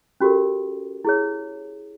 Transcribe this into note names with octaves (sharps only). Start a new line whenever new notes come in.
C#4 F#4 G4 A4 A#4
E4 G#4 C#5